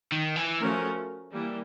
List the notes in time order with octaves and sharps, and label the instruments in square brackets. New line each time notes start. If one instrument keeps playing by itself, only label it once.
[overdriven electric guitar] D#3
E3
[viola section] F3 A3 C#4 F#4 A#4
E3 G3 A#3